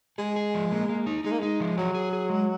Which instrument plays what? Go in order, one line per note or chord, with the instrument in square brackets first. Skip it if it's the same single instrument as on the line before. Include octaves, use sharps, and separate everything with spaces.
[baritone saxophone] G#3 [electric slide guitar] G#4
[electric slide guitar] G#4
F3
A#3
A#3
D#4
[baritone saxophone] G#3 [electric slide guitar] D#4
[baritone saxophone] A#3
[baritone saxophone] G#3 [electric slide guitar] D#4
[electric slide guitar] F3
[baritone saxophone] F#3 [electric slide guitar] G#4
[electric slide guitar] G#4
G#4
G#3